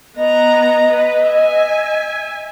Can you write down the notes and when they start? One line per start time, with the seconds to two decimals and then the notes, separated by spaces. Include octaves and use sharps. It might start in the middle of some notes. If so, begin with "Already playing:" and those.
0.17 B3 D#5 A#5
0.94 B4
1.28 E5 G#5